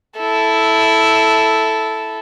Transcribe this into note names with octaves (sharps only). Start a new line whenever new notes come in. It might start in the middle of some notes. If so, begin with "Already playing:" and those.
E4 A4